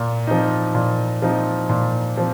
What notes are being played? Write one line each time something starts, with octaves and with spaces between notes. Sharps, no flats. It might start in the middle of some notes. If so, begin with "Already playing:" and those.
Already playing: A#2
F3 C4 D#4
A#2
F3 C4 D#4
A#2
F3 C4